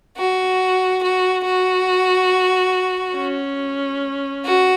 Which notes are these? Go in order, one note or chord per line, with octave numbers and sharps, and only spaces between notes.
F#4
F#4
F#4
C#4
F#4